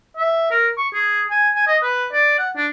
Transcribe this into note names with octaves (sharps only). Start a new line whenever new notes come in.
E5
A#4
C#6
G#4
G#5
G#5
D#5
B4
D5
F#5
D4